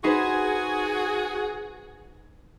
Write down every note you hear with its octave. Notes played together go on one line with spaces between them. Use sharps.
D#4 F#4 G#4 B4 C5